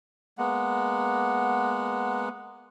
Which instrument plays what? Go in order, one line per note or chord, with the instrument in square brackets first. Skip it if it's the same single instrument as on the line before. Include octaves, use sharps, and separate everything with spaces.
[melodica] G#3 A#3 B3 F#5